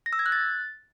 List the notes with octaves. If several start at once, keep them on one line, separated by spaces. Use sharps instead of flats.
A#6
E6
G#6
F#6
A6